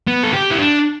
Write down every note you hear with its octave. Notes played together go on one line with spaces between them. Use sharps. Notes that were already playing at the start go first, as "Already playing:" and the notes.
B3
A4
G4
E4
D4